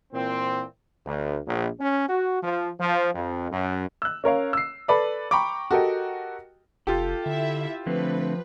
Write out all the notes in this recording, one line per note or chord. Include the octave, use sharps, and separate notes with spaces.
A#2 E3 C4
D2
A#1
C#4
F#4
F3
F3
F2
F#2
E6 F#6
C#4 A#4 C#5 F5
E6 C7
A4 B4 D5 B5
G5 A#5 B5 C#6 D6
F#4 G4 A4 A#4 D#5 G5
F1 F4 G4 A4
D3 E4 E5
D3 F3 A3 C4 B4